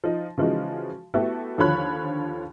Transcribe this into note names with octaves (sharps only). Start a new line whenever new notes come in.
F3 D#4
C#3 E3 F3 G#3 D#4 F#4
A3 B3 E4 F#4 G4 A4
D#2 D3 F3 C#5 B5 F#6